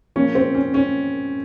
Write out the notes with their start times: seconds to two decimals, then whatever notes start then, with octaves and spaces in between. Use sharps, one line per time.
0.16 A#2 F3 A#3 C#4
0.35 C4
0.55 C#4
0.74 C#4